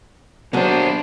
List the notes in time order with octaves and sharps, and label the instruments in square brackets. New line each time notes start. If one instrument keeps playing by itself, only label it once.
[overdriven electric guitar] B2 C5 [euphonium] F#3 [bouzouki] A#3 B3 G#4 [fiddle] D4